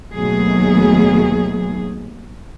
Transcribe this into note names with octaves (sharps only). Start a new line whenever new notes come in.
D#2 B2 F#3 A3 G#4